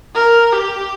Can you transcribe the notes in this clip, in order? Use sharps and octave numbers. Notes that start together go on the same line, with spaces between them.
A#4
G4